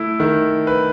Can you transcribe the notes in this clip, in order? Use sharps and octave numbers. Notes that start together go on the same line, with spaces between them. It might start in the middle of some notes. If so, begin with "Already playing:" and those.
Already playing: A3 E4
D#3
B4